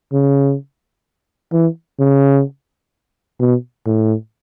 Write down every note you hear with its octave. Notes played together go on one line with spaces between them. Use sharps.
C#3
E3
C#3
B2
A2